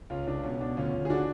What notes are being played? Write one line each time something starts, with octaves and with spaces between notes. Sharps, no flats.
C#2 C#4 F4
C#2 D4
B2 C#4
B2 D4
D2 C#4 F4
D2
G#4
D3 D4 F#4